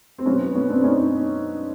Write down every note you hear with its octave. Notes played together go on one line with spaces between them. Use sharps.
C4
B2 F#3 B3 C#4
B3 C#4
C4 D4
C#4 D#4